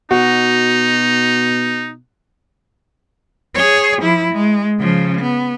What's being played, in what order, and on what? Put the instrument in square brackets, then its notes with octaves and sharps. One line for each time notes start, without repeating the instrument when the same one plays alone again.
[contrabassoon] B2 [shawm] D#4 [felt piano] F#4
[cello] G#4 C#5
F3 E4
G#3
C#3 F3
B3